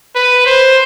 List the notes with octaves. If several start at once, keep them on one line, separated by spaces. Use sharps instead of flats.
B4
C5